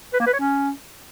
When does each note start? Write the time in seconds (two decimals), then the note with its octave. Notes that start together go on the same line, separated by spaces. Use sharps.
0.13 B4
0.20 A#3
0.26 B4
0.33 C#5
0.39 C#4